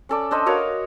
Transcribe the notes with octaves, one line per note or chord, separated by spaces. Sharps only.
C#4 A4 D5
D4 A4 C5 D#5
F#4 A#4 C#5 F5